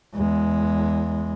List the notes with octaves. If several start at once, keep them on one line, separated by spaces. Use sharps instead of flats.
E2 G#3